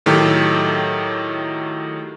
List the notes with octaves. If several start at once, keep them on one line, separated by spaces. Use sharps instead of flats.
A2 D#3 F#3 G4 A4